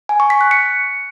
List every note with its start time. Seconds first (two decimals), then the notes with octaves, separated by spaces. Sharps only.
0.09 G#5
0.20 C#6
0.30 B6
0.41 F#6
0.51 C#7